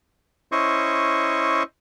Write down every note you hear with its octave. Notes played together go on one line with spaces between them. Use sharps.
C#4 E4 C5 D#5 C#6